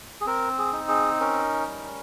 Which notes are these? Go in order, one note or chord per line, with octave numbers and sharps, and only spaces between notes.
G#4
C4 A#4
G#4
D#4
G#4
C#4 A#4
G3